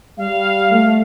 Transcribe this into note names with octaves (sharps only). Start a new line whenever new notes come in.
G3 F5
A3